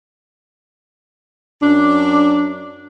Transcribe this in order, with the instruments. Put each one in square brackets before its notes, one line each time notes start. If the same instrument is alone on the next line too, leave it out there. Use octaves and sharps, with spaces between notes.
[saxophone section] F#2 D4